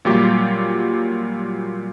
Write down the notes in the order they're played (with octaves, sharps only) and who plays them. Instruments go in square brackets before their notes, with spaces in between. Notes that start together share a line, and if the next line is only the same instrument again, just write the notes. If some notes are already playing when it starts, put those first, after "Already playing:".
[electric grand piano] A#2 F#3 G3 F4 G4 D6